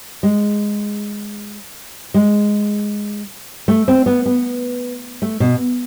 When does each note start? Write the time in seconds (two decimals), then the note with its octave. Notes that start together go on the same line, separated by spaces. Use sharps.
0.23 G#3
2.14 G#3
3.68 A3
3.88 C4
4.06 B3
4.26 B3
5.22 A3
5.40 B2